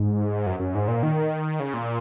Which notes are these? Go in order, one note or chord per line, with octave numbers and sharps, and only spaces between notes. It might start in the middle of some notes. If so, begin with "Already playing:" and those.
Already playing: G#2
F#2
F#2
G#2
A#2
D#3
C#3
A#2